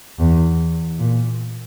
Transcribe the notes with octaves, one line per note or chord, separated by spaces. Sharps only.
E2
A#2